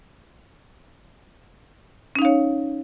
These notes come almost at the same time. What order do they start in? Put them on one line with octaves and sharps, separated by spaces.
C#4 D#4 F5 C#5